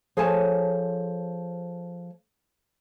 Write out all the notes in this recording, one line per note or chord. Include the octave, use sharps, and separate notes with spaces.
F3 G#4 A4 C#5 G#5 A5